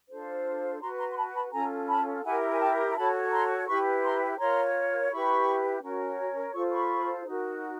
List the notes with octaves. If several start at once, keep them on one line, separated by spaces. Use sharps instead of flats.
D4 F4 A4 C5
F#4 B4 A#5 C6
A#5 C6
C6
A5 B5
A5 B5
C#4 F4 A4 G#5 A#5
A5 B5
E4 G4 A#4 F#5 G#5
G#5
G5 A5
A#5
F#4 A4 C#5 A5 B5
C#6
A#5 C6
E4 G4 B4 B5 C#6
A#5 C6
F4 A#4 C#5 A#5 C6
E4 G4 B4 B5 C#6
C#4 F#4 A#4 C#5
F4 A4 C5 C#6
B5 C#6
D#4 F#4 A#4